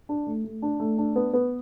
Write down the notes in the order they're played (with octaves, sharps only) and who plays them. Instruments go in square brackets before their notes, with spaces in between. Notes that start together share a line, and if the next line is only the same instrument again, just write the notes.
[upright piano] D4
A3
A3
D4
A3
D4
B3
B3